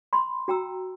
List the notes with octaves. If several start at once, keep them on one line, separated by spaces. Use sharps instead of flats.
B5 C6
F#4 G5 A#5 E6